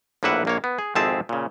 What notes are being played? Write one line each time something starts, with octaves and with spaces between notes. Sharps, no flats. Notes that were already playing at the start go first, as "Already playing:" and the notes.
A#1 A2 A#3 B4 E5 F#5
A#1 A#3 C#5
B3
G#4
G#1 F2 C4 G#4 E5 A5
A#2 C#3